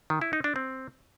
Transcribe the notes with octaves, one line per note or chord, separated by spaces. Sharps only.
D#3
E4
D#4
D4
C4